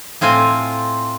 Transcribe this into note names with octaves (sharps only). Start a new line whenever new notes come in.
A2 C4 F4 G#5